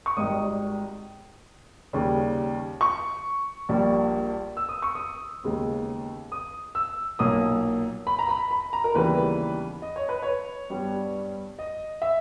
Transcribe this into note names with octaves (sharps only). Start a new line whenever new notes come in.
C#6
G#1 G#2 D#3 G3 D#6
D#2 C#3 G3
C#6
A#1 A#2 G3 A#3
E6
D#6
C#6
D#6
D#2 C#3 G#3 B3
D#6
E6
B1 A#2 A#3 D#6
B5
A#5
B5
B5
A#5
A#4
D#2 C#3 E3 G3 B3 B4
D#5
C#5
B4
C#5
G2 G3 B3
D#5
E5